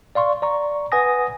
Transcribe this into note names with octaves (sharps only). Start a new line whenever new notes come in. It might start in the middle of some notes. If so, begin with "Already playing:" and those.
D5 F5 C6 C#6
D5 A#5 C#6
B4 F#5 G#5 D#6 A#6